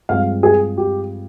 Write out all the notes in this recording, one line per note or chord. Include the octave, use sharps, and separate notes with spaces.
G2 F3 G#3 C4 F5
G#4
G4